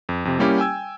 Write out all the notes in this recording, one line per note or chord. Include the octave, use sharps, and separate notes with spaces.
F2
F2 C3
G3 A#3 C#4 E4 G4
G5 G#5 E6 G#6